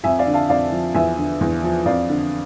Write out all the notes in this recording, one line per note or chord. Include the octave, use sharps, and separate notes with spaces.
F2 E5 G#5
D5 F5
D3
F5 A5
F2 D5 F5
F3
E2 E5 G#5
D3
E2
F3
F2 D5 F5
D3